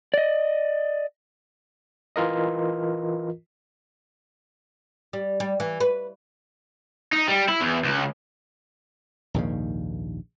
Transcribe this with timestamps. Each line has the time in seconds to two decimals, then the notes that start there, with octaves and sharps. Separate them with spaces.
0.14 D5 D#5
2.16 E3 F4 A#4 D#5
5.13 G3
5.40 G3
5.60 E3
5.80 B4
7.13 D#4
7.28 G3
7.49 E4
7.61 E2
7.85 C#2
9.34 A#1 D#2 G#2 C#3